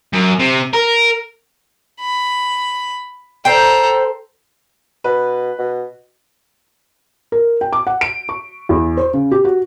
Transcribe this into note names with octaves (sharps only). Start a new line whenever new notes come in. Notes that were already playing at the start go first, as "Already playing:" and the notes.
F#2
C3
A#4
B5
A4 C5 G5 A#5
B2 B4
B2
A#4
G5
D6
F#5
D7
C#6
E2
C5
C#3
G4
F#4